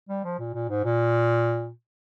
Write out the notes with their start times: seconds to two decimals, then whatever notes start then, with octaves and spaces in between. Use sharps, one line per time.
0.09 G3
0.24 F3
0.39 A#2
0.54 A#2
0.70 G#2
0.85 A#2